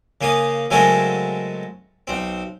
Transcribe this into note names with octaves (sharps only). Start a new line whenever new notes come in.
C#3 A#3 F5 D#6
C#3 F#3 G#3 A3 C4 A#4
B1 C4